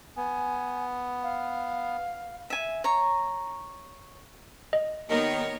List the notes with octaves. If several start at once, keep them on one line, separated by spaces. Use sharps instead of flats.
B3 G#5
F5
E5 G#5
C#5 A#5
D#5
D#2 D#3 B3 A#4 C#5